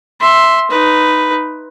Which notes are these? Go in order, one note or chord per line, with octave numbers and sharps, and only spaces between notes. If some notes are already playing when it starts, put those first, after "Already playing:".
E5 C6
D#4 B4